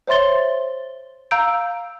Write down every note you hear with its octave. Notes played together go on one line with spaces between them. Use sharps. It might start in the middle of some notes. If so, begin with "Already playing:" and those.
C5 C#5 E5 C6 A6 G7
F5 A#5 E6 G6 D7